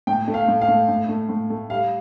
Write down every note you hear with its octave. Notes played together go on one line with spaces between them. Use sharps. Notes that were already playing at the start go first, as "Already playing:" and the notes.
A2 G5
A3
F5
A2
F5
A3
A2
A3
A2
A3
G3 F5